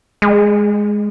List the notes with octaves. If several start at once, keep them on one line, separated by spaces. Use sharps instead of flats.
G#3